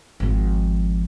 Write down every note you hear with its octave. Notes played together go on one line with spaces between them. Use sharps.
G#1 F3